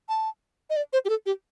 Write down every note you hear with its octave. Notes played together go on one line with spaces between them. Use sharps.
A5
D#5
D5
C5
G4
A4
G4